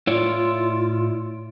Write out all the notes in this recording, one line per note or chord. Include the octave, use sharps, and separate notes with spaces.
A2 E4 F4 C#5 D5